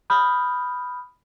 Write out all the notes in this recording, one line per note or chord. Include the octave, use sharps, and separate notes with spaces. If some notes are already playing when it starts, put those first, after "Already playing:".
B5 D#6 F6 G6